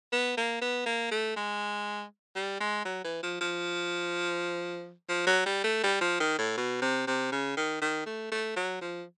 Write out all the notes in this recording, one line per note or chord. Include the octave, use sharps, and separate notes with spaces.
B3
A#3
B3
A#3
A3
G#3
G3
G#3
F#3
E3
F3
F3
F3
F#3
G3
A3
G3
F3
D#3
A2
B2
C3
C3
C#3
D#3
D#3
A3
A3
F#3
F3